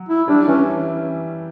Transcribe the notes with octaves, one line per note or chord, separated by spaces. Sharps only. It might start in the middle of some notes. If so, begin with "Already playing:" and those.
Already playing: F#3
E4
G3 D4
E3 C#4